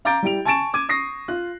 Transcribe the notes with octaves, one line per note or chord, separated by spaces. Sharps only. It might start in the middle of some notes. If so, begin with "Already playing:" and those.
F5 A#5 D6 G6 A6 D7
G3 E4 G4 D7 F7
G#5 A5 C#6 A6 D7 E7
D6 G#6 D#7
C#6 D#6 A#6 C7
F4 F#6